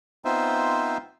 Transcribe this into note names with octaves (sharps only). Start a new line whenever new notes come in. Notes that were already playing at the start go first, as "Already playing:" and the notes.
B3 C4 D#4 F4 C5 E5